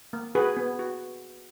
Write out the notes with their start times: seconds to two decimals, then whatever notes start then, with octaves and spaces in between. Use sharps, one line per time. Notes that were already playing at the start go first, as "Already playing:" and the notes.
0.13 A#3
0.35 F#4 G#4 B4
0.57 B3
0.79 F#4